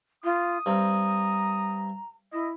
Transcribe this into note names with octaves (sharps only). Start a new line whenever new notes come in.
F4 D#6
G2 C4 A#5
E4 D#5